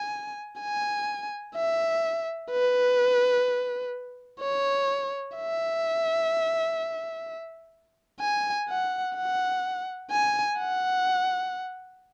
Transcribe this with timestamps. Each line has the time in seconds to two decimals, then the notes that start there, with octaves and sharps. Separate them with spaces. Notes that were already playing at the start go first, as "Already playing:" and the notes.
Already playing: G#5
0.61 G#5
1.56 E5
2.51 B4
4.41 C#5
5.36 E5
8.21 G#5
8.69 F#5
9.16 F#5
10.10 G#5
10.58 F#5